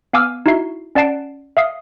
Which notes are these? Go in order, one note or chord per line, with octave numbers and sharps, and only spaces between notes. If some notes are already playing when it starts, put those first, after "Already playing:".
B3 F5 G#5 D6 E6 F6
D#4 E4 F#4 E5 C7
C#4 D5 F#5 A5 C7 D7
E5 F5 D#6 C7